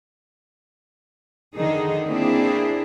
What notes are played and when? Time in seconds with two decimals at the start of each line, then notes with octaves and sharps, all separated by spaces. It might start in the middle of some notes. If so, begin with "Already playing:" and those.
1.54 D3 D#3 D#4 G#4
2.07 A#3 C4 D4 E4 G#4